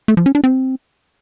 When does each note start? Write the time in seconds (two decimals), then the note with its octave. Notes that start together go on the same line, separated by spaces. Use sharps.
0.08 A3
0.17 F3
0.26 C#4
0.35 D4
0.44 C4